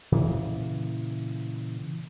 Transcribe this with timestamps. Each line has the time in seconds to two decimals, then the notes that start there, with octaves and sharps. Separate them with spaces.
0.12 A#2 C#3 E3